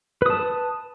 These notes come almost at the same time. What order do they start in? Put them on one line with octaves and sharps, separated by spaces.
B4 D#6 A5